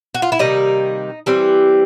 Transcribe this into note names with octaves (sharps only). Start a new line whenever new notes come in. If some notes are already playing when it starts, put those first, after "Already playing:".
F#4
F4
E4
C3 D#3 G3 A#3 D#4
E3 G3 C4